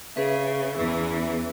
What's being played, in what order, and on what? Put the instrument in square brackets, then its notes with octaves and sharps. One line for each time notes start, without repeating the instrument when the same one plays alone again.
[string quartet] C#3 [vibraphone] C#4 G#4 B4 E5
[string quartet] E2 E3